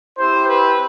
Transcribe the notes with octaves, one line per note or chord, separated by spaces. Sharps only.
C4 E4 G4 C5
B4